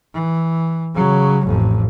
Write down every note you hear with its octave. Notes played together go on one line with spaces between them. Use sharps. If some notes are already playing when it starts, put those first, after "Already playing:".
E3
C#3 F#3
A1 F2